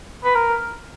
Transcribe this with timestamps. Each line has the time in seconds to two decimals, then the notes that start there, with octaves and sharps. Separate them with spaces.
0.24 B4
0.35 A#4